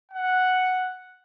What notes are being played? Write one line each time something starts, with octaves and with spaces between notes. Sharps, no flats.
F#5